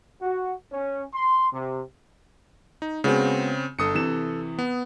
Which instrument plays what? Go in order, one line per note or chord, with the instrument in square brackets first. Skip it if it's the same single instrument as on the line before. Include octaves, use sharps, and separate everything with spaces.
[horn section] F#4
C#4
C6
C3
[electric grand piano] D#4
[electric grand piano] C#3 C4 [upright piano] G#3 B3 F#4
[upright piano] G1 [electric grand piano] A4 D#6 C#7
[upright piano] C3 E3 E7
[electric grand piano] B3